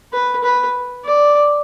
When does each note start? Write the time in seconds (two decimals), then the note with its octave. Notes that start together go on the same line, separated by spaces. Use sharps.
0.13 B4
0.44 B4
1.05 D5